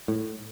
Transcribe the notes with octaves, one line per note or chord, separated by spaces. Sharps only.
A2